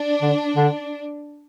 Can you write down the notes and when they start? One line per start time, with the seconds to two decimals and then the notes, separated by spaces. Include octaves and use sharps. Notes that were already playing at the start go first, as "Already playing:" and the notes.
Already playing: D4
0.22 D3
0.56 D3